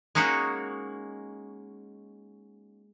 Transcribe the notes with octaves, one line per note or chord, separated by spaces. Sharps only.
G#3 A#3 C#4 D#4 F#4